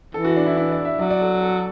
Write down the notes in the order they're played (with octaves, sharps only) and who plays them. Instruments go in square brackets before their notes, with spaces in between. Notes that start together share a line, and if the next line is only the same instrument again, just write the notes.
[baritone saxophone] E3 [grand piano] A4
[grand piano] F#4
D4
E4
E4
D5
E5
[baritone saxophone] F#3 [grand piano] D5
[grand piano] D5
A4
A4